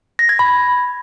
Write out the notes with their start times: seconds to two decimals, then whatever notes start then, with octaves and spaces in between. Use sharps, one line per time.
0.19 A#6
0.29 G#6
0.39 B5